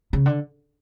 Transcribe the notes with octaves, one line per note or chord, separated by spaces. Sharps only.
C#3
D3